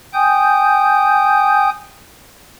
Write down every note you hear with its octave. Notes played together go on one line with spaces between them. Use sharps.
G5 G#5 D#6 G6